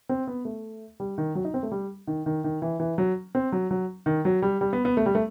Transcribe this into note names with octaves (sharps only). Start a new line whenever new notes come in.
C4
B3
A3
G3
D#3
F#3
D#4
C4
A3
G3
D#3
D#3
D#3
E3
E3
F#3
C4
F#3
F#3
D#3
F#3
G3
G3
B3
B3
A3
G3
A3